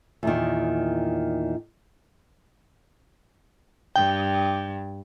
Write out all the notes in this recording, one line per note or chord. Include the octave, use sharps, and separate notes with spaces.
E2 A#2 D#3
G2 G5